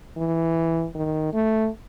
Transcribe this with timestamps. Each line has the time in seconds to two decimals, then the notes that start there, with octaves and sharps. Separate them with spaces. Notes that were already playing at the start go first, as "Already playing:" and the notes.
0.18 E3
0.95 D#3
1.33 A3